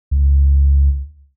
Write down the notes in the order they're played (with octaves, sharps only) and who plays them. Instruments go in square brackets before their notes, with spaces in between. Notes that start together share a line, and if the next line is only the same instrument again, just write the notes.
[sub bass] C#2